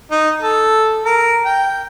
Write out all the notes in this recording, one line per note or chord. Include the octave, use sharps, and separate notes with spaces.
D#4
A4
A#4
G5